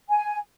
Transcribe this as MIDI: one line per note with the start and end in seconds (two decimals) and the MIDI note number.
0.09 0.38 80